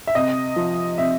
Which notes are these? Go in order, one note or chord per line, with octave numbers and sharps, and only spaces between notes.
E5
C3 D#5
F3
C3 E5